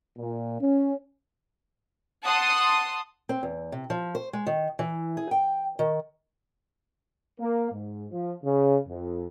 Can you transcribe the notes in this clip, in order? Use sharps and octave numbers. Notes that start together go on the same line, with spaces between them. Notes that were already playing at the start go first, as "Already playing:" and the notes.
A#2
C#4
F#5 A5 C6 D#6
C4
E2
C3
F3
C5
G#3
D#3
E3
G#4
G5
D#3
A#3
G#2
F3
C#3
F2